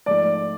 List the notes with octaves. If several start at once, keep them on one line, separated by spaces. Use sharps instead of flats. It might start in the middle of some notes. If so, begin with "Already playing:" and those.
G#2 F3 A3 D5